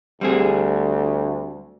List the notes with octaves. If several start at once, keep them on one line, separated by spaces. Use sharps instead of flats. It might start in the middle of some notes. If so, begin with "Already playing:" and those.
D2 G3 C4 G#4